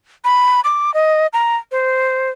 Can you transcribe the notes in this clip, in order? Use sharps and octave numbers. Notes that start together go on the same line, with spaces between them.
B5
D6
D#5
A#5
C5